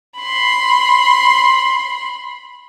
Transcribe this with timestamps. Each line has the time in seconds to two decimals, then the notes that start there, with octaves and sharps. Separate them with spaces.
0.20 B5 C6